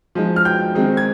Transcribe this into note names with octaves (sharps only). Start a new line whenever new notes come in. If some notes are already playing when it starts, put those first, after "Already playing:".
F3 G#3 D#4
F6
G5 G6
D#3 G#3 C4 D#4
G#6